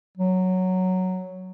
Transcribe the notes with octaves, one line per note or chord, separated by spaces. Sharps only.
F#3